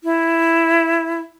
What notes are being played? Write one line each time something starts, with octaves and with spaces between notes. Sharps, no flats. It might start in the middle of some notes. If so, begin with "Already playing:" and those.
E4